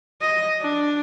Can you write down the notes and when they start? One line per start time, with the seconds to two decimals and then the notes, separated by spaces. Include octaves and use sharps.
0.21 D#5
0.61 D4